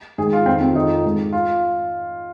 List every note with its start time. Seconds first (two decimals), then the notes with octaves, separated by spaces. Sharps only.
0.18 G#2 D#3 G#4
0.33 F4
0.46 F2 D#3 C4
0.61 C4
0.75 F2 D#3 D#4
1.05 G#2 D#3
1.33 F4